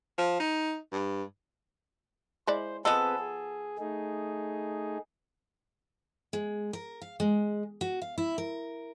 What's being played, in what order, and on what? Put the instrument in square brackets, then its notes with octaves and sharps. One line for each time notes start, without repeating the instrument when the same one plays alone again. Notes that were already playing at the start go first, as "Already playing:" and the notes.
[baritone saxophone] F3
D#4
G2
[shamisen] G#3 E4 D5 [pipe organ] C5
[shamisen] F3 D#5 [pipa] B3 A4 [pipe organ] C4 G#4 B4
[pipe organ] G#4
A3 D#4 G#4
[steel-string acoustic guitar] G#3
A#4
F5
G#3
F#4
F5
E4
A#4